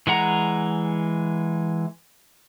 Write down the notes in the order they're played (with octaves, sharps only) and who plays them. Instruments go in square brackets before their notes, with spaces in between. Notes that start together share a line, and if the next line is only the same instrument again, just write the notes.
[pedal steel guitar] E3 G#3 F#5 A#5